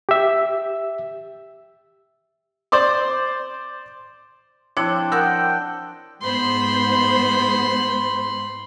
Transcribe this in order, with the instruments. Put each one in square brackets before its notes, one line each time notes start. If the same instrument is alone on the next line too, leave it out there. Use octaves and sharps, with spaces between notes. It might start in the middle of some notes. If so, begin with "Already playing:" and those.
[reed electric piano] G4 E5
[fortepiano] C5 D5 C6 D6
[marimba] F3 E4 C#5 [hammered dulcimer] C4 D4 C5 [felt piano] D6 C#7
[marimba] A#4 F#5 D#6 [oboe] G5 [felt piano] E6 F#6
[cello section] G#2 B3 C5 [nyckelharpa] B5 C6